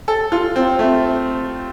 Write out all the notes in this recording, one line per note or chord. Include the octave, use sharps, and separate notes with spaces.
A4
F4
C4
A3